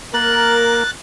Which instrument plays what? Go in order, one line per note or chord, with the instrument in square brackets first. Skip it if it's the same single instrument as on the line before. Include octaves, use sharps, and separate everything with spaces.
[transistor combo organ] A#3 [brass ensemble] A#4 [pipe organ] F#6 A6